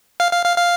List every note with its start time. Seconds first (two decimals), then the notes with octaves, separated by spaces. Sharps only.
0.20 F5
0.32 F5
0.45 F5
0.57 F5